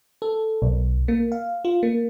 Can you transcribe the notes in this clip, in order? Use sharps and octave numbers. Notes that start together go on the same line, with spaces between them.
A4
B1
A#3
F5
F4
A#3